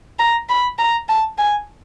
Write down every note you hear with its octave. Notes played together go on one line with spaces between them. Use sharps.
A#5
B5
A#5
A5
G#5